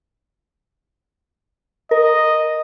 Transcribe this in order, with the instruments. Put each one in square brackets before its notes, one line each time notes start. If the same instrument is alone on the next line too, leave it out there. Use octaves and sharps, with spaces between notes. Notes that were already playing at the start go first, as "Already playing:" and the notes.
[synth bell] A#4 [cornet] D#5